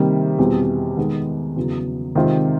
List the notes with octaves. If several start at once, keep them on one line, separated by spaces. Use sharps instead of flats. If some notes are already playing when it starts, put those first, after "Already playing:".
Already playing: C3 D#3 G3 A#3
E2 B2 G3 C4
D#3 G#3 B3 D#4
E2 C#3 F#3
C3 D#3 G#3 C4 F4